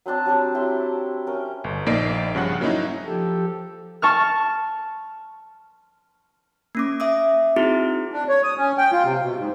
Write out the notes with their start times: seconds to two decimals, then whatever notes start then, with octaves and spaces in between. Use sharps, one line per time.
0.06 F#3 C4 D4 A5
0.25 F#3 G3 C4 D4
0.54 F#3 E4 G4 C6
1.27 C#4 A#4 G5
1.64 G1
1.86 A#1 A#3 D#4 D5 C7 D7
2.35 G2 C#3 F3 F#5 F#6
2.61 F#3 A#3 C#4 D#4 E4
3.05 F3 G4 A4
4.02 A5 C#6 F6
6.75 A#3 C#4 D6
7.00 E5 D6 D#6
7.56 C4 D#4 E4 F#4 G#4
8.12 D4
8.28 C#5
8.43 D#6
8.58 C#4
8.78 G5
8.92 F4
9.04 C3
9.22 B2
9.39 G#2